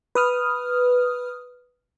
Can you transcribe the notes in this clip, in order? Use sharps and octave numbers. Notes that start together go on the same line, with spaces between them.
B4 D#6 F6